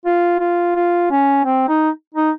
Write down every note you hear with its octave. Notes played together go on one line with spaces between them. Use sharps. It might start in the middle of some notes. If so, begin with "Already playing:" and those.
F4
F4
F4
C#4
C4
D#4
D#4